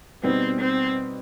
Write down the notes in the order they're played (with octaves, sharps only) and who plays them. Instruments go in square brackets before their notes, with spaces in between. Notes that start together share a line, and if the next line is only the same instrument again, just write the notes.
[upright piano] B2 G3 B3 D#4 [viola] C4
[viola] C4